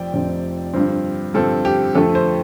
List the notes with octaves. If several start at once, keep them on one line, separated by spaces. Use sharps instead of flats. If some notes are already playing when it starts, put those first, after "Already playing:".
Already playing: F1 F2 F3 C4 D5 G5
F1 F2 F3 C4
G2 D3 F3 C4
G2 D3 F3 C4 A4
G4
F2 D3 F3 A3 A4
C5